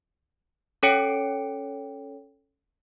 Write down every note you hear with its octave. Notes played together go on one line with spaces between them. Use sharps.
C#4 A4 C#5 G5 C#7 D7